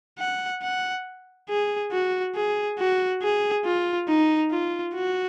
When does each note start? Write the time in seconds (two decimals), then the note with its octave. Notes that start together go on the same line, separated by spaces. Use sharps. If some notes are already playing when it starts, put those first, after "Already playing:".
0.19 F#5
0.62 F#5
1.49 G#4
1.92 F#4
2.35 G#4
2.79 F#4
3.23 G#4
3.65 F4
4.08 D#4
4.51 F4
4.95 F#4